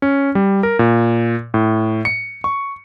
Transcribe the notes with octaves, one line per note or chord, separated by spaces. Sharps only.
C#4
G3
A#4
A#2
A2
C#7
C#6